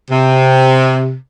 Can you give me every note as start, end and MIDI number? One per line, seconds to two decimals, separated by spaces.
0.11 1.14 48